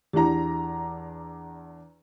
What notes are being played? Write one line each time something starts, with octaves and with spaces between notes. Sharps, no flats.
E2 D4 E4 G4 A#5